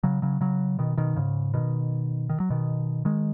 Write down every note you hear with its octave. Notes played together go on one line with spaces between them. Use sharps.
C#3 F#3
C#3 F#3
C#3 F#3
B2 D#3
B2 D#3
G#2 C#3
B2 D#3
D#3
F#3
B2 D#3
D#3 G#3